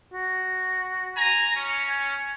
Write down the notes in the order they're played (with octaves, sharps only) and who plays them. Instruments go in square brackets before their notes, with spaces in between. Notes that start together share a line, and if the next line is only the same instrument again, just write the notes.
[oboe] F#4
[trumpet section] G#5 A#5
C#4
[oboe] G#5